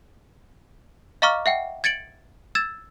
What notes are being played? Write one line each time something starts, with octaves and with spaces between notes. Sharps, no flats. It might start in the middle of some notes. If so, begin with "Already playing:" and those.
D#5 F5 A#5 C#6 D6 F6
E5 F#5 G5
G#6 A6 C#7 D7 F#7
E6 G#6 A6 E7